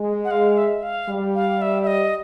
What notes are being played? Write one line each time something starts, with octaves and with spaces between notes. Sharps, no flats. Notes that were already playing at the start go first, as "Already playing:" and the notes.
Already playing: G#3
F#5
F5
E5
F5
G3
F5
E5
E5
D#5